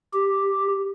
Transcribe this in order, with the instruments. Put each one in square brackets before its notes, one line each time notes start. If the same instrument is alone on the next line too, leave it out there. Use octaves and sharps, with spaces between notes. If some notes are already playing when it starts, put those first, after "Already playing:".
[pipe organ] G4